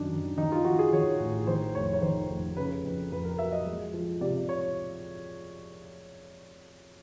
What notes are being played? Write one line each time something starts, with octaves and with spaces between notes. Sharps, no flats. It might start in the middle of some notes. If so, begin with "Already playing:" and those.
Already playing: F#2 D#3 D4 D#4
D#3
D#3 D#4
F4
D#3 F#4
G#4
D#3 C#5
A1
D#3 C5
F1 C#5
C#5
D#3 C5
F1
C#3 B4
F2
F2 B4
A#4
F#3 E5
D#5
G#3
F3
C3 D5
C#5